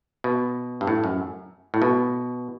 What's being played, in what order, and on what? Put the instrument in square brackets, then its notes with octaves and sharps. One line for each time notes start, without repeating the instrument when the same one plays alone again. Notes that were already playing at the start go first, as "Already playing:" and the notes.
[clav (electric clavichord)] B2
G2
A2
F#2
A2
B2